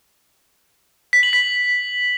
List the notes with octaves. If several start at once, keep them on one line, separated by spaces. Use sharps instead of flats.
B6
F#7
B6